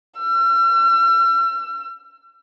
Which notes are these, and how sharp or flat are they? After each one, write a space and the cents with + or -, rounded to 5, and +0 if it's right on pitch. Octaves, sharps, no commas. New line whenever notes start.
E6 +45